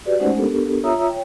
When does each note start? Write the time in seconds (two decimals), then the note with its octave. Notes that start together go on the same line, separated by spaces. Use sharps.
0.06 F#4 G4 B4 D5
0.19 G#3 A3 C#4 D#4 C5 F#5
0.37 B3 D4 G4 A4 A#4
0.83 F4 C#5 E5 A#5 D#6 E6
1.07 C#5 G5